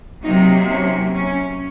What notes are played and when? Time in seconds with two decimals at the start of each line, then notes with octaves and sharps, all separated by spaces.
0.23 C3 F#3 A#3 D#4
0.69 C#4
1.14 C#4